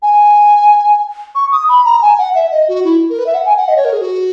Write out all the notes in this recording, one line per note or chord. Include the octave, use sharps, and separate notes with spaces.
G#5
C#6
D#6
B5
A#5
G#5
F#5
E5
D#5
F#4
E4
A#4
B4
E5
F#5
G#5
F#5
D#5
C#5
A#4
G#4
F#4